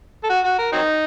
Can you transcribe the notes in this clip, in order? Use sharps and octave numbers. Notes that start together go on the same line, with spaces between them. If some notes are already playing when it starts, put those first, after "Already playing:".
A4
F#4
F#4
A#4
F#3 C4 D#4